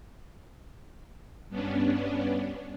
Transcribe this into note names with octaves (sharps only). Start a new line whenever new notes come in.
G2 B3 C#4 D4